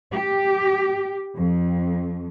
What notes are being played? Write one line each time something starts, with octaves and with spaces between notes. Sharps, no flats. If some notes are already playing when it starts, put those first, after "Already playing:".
G4
F2